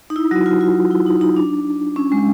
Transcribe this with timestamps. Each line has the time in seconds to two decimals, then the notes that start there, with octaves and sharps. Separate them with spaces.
0.10 D#4
0.16 E4
0.31 F#3 F#4
0.46 F4
0.61 F4
0.91 E4
1.06 D#4
1.21 D#4
1.36 D4
1.96 C#4
2.12 G#3